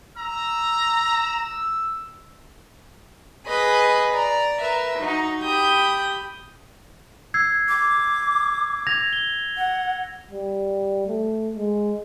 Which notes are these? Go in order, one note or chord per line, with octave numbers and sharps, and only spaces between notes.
A#5 E6
G#4 B4 D#5 B5
D5 A#5
A#4 B4 E5
F#3 D#4
G4 B5 D#6 G6
E6 G#6 C7
D6
G#6 A#6 F7
G7
F#5
G3
A3
G#3